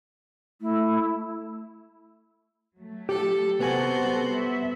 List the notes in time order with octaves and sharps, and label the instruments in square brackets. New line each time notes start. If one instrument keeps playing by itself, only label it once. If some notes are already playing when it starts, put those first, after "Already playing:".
[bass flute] A3 [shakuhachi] E4
[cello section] F#3 A3
[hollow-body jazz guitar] G4 [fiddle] A4
[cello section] C3 G4 A4 [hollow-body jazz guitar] B3 G#5 [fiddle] F#4 C5
[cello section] G3 A4
E5